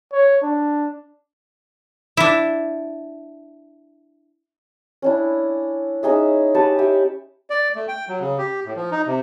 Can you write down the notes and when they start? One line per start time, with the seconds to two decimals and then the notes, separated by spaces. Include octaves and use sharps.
0.13 C#5
0.43 D4
2.17 D4 E4
5.02 C#4 D4 E4
6.03 C#4 D#4 G#4 E5
6.54 G4 B4 A5 C#6
6.78 G4 C#5 E5
7.50 D5
7.75 A3
7.88 G5
8.08 F#3
8.20 C#3
8.38 G4
8.65 A2
8.76 F3
8.91 D#4
9.07 C3